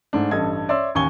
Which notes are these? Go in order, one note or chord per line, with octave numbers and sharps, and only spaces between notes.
G#2 A3 D4
A1 G2 A4 D#5 G#6
C#5 D5 E5 C6 E6
A1 D#2 G#5 C#6 G#6 G7